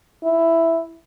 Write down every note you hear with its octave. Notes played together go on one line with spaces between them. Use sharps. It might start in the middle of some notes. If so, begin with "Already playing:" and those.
E4